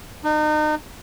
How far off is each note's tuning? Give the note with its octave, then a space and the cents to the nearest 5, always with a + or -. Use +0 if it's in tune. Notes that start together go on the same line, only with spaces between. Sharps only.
D#4 -35